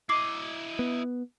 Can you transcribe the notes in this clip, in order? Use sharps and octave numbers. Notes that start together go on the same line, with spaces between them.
E4 D#5 D6 C7
B3